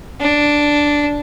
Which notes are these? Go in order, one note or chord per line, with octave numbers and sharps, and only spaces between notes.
D4